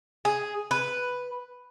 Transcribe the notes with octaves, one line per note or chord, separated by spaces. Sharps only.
G#4
B4